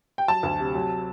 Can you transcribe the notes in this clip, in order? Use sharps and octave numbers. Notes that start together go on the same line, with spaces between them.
G5
F#3 A5
D2
C3
F#3